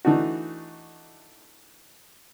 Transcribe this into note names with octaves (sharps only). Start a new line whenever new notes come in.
E3 A3 D4 D#4 F#4